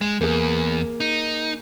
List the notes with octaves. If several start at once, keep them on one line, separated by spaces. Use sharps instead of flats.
G#3 E7
E2 A#3 G#4
D#4